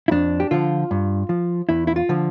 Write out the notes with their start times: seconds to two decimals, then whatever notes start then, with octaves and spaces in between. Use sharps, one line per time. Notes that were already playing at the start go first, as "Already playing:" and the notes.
0.08 E4
0.11 F2 D4
0.40 G4
0.51 D3 F3 F4
0.91 G2
1.29 F3
1.69 E2 E4
1.87 E4
1.96 F4
2.09 D3 F3